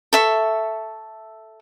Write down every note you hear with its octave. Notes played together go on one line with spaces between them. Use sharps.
A4 E5 C#6